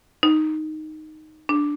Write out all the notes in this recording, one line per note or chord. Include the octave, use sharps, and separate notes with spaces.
D#4
D4